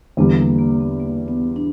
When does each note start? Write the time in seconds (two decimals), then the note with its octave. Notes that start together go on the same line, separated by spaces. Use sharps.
0.17 E2 D3 G3 B3
0.38 A#3
0.59 A#3
0.80 B3
1.00 A#3
1.28 B3
1.56 D4